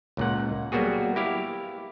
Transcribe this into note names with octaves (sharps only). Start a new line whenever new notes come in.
C#2 A#2 F#5
F#3 G3 A#3 B3 F#4 G#4
E4 G4 F5